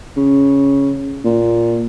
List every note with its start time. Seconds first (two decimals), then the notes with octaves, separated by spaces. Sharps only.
0.17 C#3
1.25 A#2